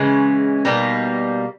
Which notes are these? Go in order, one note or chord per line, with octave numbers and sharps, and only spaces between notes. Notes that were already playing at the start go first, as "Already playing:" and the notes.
Already playing: C#3 E3 G#3 C#4
B2 G3 A#3 D#4